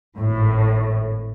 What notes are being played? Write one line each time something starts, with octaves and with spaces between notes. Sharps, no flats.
G#1 A2